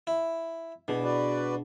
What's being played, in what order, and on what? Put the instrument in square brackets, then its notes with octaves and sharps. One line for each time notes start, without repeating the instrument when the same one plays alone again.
[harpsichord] E4
[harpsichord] B2 [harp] D4 E4 G#4
[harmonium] F#4 B4 D5